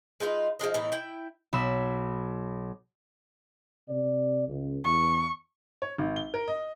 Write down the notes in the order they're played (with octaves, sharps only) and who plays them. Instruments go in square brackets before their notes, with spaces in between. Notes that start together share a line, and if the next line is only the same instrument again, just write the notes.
[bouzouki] G#3 D#4 F4 B4
F3 G#3 D4 D#5
A2 E3 B3 D#4
E4 G5
[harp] B1 B5 E6
[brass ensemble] C3 D5
C#2
[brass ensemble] E2 [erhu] C#6
[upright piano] C#5
G#1
G7
A#4
D#5